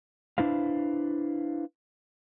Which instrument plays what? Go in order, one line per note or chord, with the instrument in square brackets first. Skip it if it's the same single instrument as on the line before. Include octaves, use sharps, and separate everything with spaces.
[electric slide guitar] D4 E4 B4 C5 F5